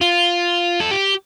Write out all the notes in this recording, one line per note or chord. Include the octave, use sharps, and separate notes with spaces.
F4
A4
G4